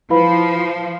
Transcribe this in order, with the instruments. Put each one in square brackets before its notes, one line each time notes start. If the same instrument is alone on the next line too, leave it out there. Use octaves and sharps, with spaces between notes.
[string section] F3 [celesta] E4 B4 F5 B5